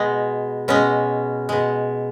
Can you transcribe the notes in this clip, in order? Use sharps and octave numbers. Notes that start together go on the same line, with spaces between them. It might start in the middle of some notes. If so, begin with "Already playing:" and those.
Already playing: B2 G#3
B2 G#3 C#4
B2 G#3